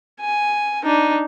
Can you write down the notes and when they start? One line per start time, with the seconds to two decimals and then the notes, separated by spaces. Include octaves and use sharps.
0.21 G#5
0.83 D4 D#4